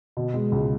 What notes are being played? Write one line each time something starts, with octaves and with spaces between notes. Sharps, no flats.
B2
G#3
C#2